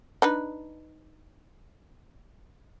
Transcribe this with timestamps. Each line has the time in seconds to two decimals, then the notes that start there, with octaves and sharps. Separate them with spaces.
0.22 D4 D#4 B4